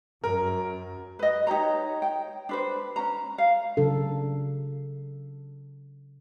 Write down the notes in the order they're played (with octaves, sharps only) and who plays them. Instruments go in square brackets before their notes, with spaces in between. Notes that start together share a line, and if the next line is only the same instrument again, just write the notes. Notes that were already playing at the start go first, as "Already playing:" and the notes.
[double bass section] F#2 [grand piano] A#4
[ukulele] B4 D#5
D#4 G4 C#5 A#5
G5
D4 B4 C5
C#4 A#5
F5
[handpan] C#3 F#3 D4 A4